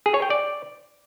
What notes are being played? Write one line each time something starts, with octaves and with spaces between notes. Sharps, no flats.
G#4
C#5
G5
D5